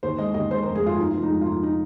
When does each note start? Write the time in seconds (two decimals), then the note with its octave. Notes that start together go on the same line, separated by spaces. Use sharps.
0.03 D#2 C5
0.18 G#3 D#5
0.34 D#2 D#5
0.50 G#3 C5
0.63 A#4
0.67 F1
0.75 G#4
0.82 G#3 F4
0.98 F3 D#4
1.11 F1 F4
1.23 D#4
1.30 G#3
1.41 F4
1.46 F3 D#4
1.63 D#4